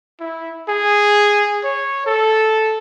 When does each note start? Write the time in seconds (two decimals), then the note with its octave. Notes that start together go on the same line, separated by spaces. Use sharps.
0.20 E4
0.69 G#4
1.64 C#5
2.06 A4